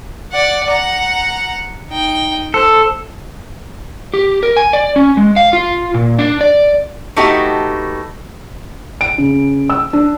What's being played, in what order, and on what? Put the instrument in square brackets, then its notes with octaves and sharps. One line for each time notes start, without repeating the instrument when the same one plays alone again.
[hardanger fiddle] D5 F#5
F#5 A#5
D#4 G5
[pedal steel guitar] A4 [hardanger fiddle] C5
[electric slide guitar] G4
A#4
G#5
D5
C#4
G#3
F5
F4
A#2
D4
D5
[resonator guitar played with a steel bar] A3 B3 D#4 F#4 G4
[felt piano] D7
C#3
E6
D4